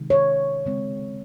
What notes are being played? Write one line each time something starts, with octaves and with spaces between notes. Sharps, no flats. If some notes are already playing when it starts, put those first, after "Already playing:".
Already playing: C3 D#3 G#3
C#5
C#3 G#3 C4